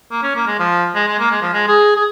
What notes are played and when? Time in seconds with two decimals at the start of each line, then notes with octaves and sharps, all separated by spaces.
0.11 A#3
0.23 C#4
0.35 A#3
0.47 G#3
0.59 F3
0.95 G#3
1.08 G#3
1.19 A#3
1.31 G#3
1.42 F3
1.53 G#3
1.68 G#4
1.97 G#4